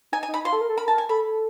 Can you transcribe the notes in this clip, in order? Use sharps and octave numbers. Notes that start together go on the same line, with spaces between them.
D#4 G#5
G#5
D#4
B5
F4 C6
A4
A#4
A4
A#4 B5
A5
G#5
A4 B5